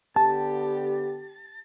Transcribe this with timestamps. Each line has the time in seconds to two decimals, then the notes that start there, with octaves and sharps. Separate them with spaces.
0.16 D3 B3 G4 A5